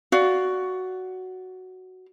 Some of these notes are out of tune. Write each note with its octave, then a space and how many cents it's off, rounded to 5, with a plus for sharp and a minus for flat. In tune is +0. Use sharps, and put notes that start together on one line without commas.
F#4 +5 D5 -10 F5 +0